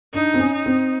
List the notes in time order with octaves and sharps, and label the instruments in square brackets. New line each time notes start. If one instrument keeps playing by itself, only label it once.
[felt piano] D4 [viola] D#4
[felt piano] C4
C#4
[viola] D#4
[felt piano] C4